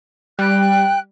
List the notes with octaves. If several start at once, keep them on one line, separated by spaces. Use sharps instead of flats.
G3 G5 F#6